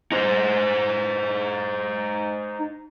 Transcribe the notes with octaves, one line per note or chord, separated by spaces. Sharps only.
D#4 C5